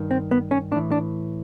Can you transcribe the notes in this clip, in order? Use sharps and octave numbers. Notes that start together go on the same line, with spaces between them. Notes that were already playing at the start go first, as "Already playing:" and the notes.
Already playing: G2 D#3
C4
B3
C#4
A2 E3 D4
D4